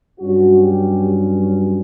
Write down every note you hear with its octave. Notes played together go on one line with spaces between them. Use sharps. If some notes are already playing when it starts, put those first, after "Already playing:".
G2 F#3 C#4 F#4
G4